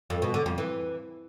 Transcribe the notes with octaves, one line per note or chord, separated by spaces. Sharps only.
F2
B2
D3
F2
E3